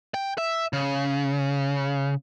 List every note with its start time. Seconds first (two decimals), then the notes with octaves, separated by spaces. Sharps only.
0.14 G5
0.38 E5
0.73 C#3